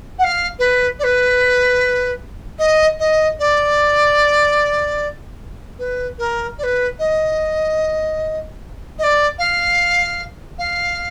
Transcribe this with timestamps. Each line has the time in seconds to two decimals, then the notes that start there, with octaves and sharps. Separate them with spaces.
0.18 F#5
0.23 F5
0.59 B4
0.99 D5
1.03 B4
2.58 D#5
2.99 D#5
3.39 D5
5.79 B4
6.18 A#4
6.58 D5
6.63 B4
6.98 D#5
8.98 D#5
9.03 D5
9.38 F5
10.58 F5